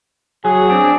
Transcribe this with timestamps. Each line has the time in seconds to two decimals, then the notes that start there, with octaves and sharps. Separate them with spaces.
0.45 F#3 G#4
0.70 C4 D4